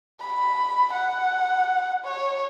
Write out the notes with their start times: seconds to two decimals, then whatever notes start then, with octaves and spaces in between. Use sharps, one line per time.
0.21 B5
0.93 F#5
2.05 C#5